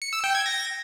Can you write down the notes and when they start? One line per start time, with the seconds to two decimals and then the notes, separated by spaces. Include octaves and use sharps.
0.02 C#7
0.13 E6
0.24 G5
0.35 G#6
0.46 A#6